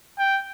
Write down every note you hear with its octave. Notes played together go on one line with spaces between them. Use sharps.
G5